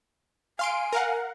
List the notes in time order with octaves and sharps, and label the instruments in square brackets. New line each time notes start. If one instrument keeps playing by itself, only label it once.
[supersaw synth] F5 C6 D7 [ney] G#5
[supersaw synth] A#4 F5 F#5